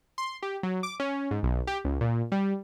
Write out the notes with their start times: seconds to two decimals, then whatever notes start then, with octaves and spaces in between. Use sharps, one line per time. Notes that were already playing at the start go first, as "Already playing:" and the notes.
0.18 C6
0.43 G4
0.63 F#3
0.83 D6
1.00 C#4
1.31 G#2
1.43 B1
1.67 G4
1.84 C#2
2.01 A#2
2.32 G3